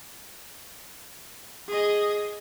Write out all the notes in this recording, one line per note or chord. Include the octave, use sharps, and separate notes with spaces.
G#4 D#5